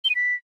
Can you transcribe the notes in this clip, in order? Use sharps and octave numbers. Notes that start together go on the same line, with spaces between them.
G7
D#7
B6